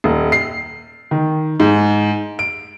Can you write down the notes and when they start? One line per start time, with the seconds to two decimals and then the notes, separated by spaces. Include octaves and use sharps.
0.04 D#1
0.32 C7
1.11 D#3
1.60 G#2
2.39 D7